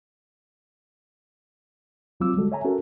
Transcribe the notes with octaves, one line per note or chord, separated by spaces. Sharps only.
C2 F#3 C4 F4 D6 E6
D3 G3 G#3 F#4 A4
C#5 E5 G#5 A#5
C#4 F#4 A4 A#4